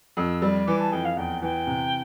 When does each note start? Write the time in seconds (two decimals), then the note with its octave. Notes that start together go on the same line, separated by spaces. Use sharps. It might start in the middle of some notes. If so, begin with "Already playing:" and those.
0.17 F2 E6
0.42 G3
0.67 E3 D6
0.79 A5
0.92 F2 G5
1.05 F5
1.17 E2 G5
1.42 E3 G5
1.67 C3